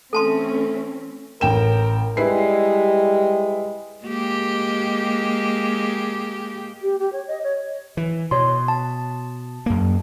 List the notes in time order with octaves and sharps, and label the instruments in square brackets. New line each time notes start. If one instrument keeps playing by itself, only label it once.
[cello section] E3 C4 C#4 [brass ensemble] A3 [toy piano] A4 A5 C6
[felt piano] A1 G5 E7 [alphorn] A#4
[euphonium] G3 [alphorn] G#3 [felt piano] E4 B4 C7
[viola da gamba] G#3 A#3 G4
[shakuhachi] G4
G4
C#5
D#5
C#5
[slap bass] E3
[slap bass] B2 [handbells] C#5 C6
[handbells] A5
[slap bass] F#2 A#3